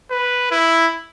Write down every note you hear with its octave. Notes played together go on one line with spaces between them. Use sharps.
B4
E4